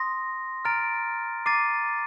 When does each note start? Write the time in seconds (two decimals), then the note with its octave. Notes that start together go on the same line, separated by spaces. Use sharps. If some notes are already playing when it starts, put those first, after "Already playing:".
Already playing: C6 D#6 A#6
0.65 A#5 F6 A6 D7
1.46 A#5 D6 A6 C7 D#7